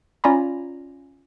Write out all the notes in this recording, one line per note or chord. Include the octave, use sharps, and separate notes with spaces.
C#4 F4 D5 G#5 A#5 B5